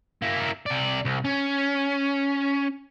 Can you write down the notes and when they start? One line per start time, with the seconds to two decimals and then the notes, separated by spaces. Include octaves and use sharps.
0.22 A#3 E4
0.66 C3 D5
1.05 C2
1.25 C#4